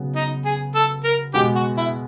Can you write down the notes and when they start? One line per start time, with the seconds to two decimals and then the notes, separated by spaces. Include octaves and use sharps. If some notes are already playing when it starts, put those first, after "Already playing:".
Already playing: C#3 F#3 B3
0.16 D#4
0.46 G#4
0.75 A4
1.04 A#4
1.34 B2 G#3 B3 G4
1.56 F#4
1.78 E4